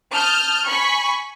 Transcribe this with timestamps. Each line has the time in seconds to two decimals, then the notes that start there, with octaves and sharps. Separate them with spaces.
0.12 A5 D#6 F6 G6
0.65 G#5 B5 C#6